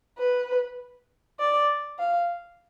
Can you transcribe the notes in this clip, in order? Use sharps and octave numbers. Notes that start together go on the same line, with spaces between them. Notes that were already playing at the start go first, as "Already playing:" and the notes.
B4
D5
F5